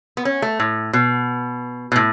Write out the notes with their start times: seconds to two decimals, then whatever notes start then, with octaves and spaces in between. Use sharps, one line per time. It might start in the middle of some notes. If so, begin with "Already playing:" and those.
0.17 B3
0.25 C#4
0.42 A3
0.60 A2
0.93 B2
1.92 B2
1.96 A2